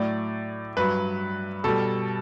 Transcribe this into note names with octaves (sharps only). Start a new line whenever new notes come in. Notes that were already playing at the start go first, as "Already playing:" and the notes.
Already playing: A2 F#3 D5
G2 F#3 B4
B2 G3 A4